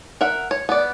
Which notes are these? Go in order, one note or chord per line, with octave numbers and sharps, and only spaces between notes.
A#4 E5 F#5
C#5
B3 D5